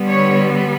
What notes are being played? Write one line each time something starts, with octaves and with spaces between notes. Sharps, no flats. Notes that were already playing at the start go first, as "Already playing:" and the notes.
Already playing: D3 G3 B3
C#5